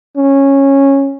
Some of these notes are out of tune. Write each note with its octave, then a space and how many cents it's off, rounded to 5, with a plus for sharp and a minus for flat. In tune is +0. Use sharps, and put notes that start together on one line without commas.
C#4 -10